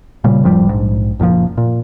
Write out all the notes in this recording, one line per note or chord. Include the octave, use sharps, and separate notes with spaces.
A#2 C#3 G3
E1 G#2 F3 G3
A#1 G#2
F#1 A#2 C#3 F3
A#2